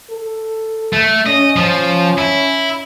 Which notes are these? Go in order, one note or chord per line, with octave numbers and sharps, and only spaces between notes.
A4
A3
C#4 D#5
F3
E4